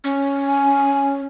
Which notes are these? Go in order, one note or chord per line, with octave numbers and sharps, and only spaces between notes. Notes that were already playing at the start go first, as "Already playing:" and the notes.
C#4
G#5